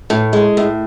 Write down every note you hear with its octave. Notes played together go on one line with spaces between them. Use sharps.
A2
G#3
A2